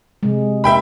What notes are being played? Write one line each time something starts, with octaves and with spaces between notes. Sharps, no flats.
C3 G#3
E5 G5 B5